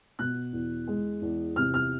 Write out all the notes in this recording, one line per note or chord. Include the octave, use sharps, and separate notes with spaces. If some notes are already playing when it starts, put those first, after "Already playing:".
B2 F#6
E2
G#3
E2
C3 F6
F6